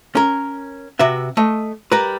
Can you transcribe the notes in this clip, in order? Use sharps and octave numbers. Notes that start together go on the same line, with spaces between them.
C#4 A#4
C3 F#4 B4 E5
A3 D#5
G3 A#4 B4